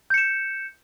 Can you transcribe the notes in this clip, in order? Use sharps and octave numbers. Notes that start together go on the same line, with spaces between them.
G6 C#7 E7